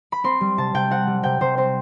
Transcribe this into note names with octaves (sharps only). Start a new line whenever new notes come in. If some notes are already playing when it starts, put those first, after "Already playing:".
B5
C4 C6
G3
C3 A5
C3 G5
C4 F#5
G3
C3 G5
C3 C5
C4 C5